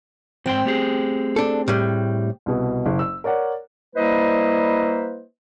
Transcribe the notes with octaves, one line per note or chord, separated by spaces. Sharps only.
G#2 C4 G5 C6
A3 G4 G#4
D4 A4
A2 G3
C2 B2
F#1
E6
A#4 C#5 D5 F#5
G3 A#3 E4 B4 C5 D#5